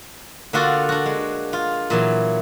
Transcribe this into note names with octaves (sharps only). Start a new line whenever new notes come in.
D3 A#3 D4 F4 F#4 A4
D4 F#4
G#3
F4
A#2 E3 F#3